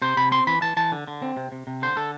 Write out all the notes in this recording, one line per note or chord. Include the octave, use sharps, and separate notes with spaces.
C3 C5
C3 B5
C4 C6
E3 B5
E3 A5
E3 A5
D3
D3
C4
C3
C3
C3
D3 C5
D3 A4